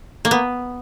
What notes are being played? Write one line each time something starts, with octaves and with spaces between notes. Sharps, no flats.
A#3
B3